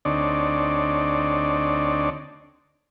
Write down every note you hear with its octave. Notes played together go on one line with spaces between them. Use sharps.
D2 C4 D4 D#4 C#5 D5